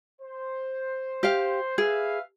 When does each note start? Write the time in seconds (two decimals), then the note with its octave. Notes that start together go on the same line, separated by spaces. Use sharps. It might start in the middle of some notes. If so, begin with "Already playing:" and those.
0.21 C5
1.23 G4 F5
1.78 G#4 B4 E5 F5